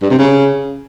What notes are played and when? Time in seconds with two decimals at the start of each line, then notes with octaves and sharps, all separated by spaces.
0.02 G2
0.10 C3
0.19 C#3